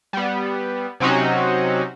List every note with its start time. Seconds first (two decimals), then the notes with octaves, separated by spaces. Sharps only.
0.13 G3 B3
1.00 C3 F#3 C4 C#4 D#4 F#4